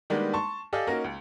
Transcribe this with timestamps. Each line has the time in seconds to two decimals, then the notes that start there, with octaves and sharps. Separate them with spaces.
0.10 D#3 G3 G#3 A#3 B3 D4
0.33 A5 C6 C#6
0.73 G4 A4 D5 D#5 F5 G#5
0.87 A#3 C#4 D#4 F#4 A#4
1.04 C#2